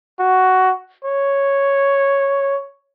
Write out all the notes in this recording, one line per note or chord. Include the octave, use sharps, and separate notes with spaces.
F#4
C#5